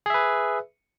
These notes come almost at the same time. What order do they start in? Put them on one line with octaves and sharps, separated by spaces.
G#4 E5 B4